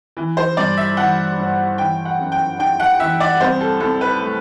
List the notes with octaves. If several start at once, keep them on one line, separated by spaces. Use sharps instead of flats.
E3
C5
G2 D5
E5
E3 F#5
G1
E3 G5
F#5
F#2
G5
D4 G5
F#5
E3 E5
D5
C2 C5
A4
C2 A4
B4
A3